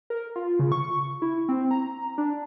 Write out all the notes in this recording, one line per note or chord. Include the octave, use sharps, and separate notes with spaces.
A#4
F4
C#3
C#6
E4
C4
A#5
D4